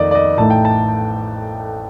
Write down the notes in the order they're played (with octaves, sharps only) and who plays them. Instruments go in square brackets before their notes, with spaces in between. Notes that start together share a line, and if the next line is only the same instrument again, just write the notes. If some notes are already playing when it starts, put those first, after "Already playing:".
Already playing: [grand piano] F2 D#3 A#3 D#4 D5 D#5
D5
D#5
A1 A2 A3 D#4 A5
G5
A5